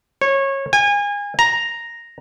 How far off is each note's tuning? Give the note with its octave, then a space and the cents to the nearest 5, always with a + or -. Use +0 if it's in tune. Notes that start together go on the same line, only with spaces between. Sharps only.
C#5 -20
G#5 -30
A#5 +0